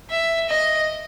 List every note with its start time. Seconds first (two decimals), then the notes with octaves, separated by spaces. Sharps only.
0.10 E5
0.49 D#5